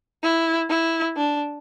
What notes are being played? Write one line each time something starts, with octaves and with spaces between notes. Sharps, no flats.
E4
E4
D4